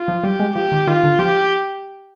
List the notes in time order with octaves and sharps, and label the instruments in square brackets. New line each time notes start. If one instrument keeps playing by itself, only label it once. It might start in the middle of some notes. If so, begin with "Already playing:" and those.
Already playing: [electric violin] F4
[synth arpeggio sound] F3
[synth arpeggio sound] G3 [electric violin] G4
[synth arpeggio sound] G#3
[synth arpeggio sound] F3 [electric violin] G4
[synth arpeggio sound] D#3
[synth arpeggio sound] D#3 [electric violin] F4
[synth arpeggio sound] D3
[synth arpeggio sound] F3 [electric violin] G4